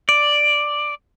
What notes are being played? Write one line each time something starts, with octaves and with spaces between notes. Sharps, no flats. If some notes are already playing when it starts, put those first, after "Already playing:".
D5